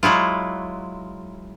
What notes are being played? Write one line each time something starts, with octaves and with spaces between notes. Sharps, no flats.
F#3 G#3 E4 F4